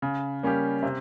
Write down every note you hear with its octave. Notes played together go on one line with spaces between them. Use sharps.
C#3
G3 A#3 C#4 G4
C3